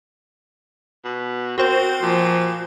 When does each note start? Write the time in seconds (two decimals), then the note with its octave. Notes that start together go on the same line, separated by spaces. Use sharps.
1.05 B2
1.58 C4 F#4 A#4 C5
2.02 A#2 F3